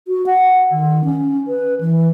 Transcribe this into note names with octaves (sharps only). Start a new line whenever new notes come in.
F#4
F#5
D#3
C#4
B4
E3